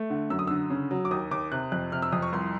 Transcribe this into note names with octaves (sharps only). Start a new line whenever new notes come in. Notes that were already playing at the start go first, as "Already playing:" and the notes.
Already playing: A3
D3
F#2 E6
D#6
D3 E6
C#3
F#3
D6
D#2 D#6
D#2 D6
C3 F#6
F2 F#6
C3 F6
E6
F2 D#6
C#6
C2 C6